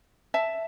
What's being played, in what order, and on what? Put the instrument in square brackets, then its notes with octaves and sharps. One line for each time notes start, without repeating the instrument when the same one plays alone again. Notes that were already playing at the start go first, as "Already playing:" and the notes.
[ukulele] E5 A5